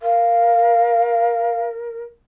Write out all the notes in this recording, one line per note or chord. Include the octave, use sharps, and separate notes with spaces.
A#4 F5